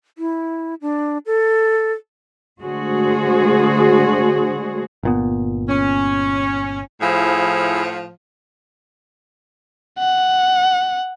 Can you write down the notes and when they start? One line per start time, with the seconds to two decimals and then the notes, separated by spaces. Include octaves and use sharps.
0.18 E4
0.81 D4
1.26 A4
2.61 D3 G#3 A3 F#4 G#4 C5
5.03 G1 A#2 B3
5.69 C#4
7.01 A2 F3 E4 G#4
9.99 F#5